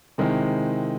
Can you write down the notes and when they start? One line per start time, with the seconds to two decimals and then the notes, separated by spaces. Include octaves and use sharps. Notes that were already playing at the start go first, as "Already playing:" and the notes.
0.18 C3 D#3 G#3 C4 E4